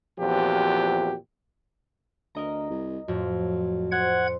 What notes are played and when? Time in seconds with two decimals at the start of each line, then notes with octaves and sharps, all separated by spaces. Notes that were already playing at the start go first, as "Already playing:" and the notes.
0.18 E2 A#2 F3 C4 F#4 G4
2.35 D2 A#4 D#5 A#5
2.70 C2
3.08 F2 A2 F#3
3.92 C5 F#5 G#6